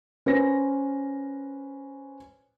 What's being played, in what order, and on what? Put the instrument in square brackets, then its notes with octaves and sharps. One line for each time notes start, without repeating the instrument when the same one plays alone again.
[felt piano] C#4 B4 C5 A#6